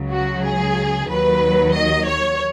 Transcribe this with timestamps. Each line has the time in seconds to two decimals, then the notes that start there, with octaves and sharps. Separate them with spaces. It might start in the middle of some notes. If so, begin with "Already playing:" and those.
Already playing: C#2 C#3 F#3
0.10 F#4
0.43 G#4
1.08 D#2 D#3 F#3 B4
1.74 D#5
2.05 C#5